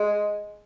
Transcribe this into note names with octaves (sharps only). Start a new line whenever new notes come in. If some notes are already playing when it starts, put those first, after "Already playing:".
Already playing: G#3